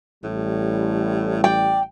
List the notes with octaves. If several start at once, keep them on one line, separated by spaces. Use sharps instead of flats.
A1 A2 G3
D5 G5